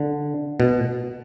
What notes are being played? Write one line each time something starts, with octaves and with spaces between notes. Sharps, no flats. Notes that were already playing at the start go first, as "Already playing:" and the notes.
Already playing: D3
B2